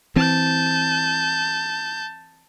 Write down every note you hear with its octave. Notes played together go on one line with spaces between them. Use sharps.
E3 C4 A5 G6